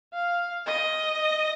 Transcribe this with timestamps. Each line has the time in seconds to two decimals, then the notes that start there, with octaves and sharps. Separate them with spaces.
0.13 F5
0.66 D#5